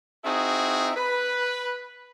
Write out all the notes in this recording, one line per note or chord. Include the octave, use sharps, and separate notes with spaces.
C4 D#4 E4 F#4 G#4
B4